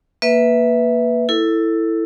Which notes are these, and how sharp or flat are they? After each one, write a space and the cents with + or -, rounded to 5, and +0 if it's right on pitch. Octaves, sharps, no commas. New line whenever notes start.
A#3 +0 B4 -5 E5 +0
E4 +0 A4 +15